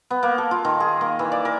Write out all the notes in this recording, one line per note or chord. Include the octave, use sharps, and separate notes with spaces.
B3
A#3
A4
F4
D#3
G#4
A#3
E3
D5
A#4